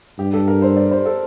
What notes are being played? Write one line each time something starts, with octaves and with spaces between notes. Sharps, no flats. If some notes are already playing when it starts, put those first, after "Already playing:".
G2 G4
A4
A#4
C5
D5
C5
A4